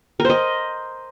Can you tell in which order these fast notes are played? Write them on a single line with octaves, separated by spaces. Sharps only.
A#4 C5 D#5